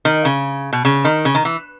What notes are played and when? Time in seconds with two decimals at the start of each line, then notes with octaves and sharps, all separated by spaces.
0.05 D#3
0.25 C#3
0.73 B2
0.85 C#3
1.05 D#3
1.25 C#3
1.35 D#3
1.45 E3